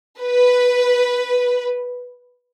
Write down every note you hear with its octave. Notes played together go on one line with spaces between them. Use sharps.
B4